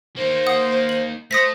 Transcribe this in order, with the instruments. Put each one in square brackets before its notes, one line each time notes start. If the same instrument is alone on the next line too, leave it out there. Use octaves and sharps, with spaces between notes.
[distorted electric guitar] A#3 D#4 [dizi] C5
[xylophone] F#5 D#6
F#7
[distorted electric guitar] A3 [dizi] C5 [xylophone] D#6 A#6 B6